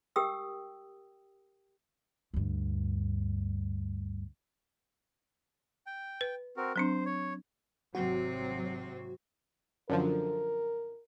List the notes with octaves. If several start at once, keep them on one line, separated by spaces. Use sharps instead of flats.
G4 A#4 G5 D#6 E6
D2 G2
G5
B4
C4 F#4 A#4
F#3 C4 D4 C5
C#5
G#1 C3 F#3 C4 F#4
F#2 D3 F3 A#4